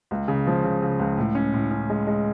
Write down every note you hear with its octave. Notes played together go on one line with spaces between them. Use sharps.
C#2
C#3
F3
C#3
C#3
C#2
A2
C#4
A2
C#4
G#3
G#3